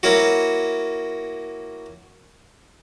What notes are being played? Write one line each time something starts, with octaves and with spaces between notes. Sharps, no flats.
A#3 C#4 E4 F#4